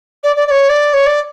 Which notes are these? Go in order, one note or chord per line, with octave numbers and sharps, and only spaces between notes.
D5
D5
D5
C#5
D5
C#5
D5